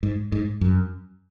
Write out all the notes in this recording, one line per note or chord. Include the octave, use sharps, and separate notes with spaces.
G#2
G#2
F#2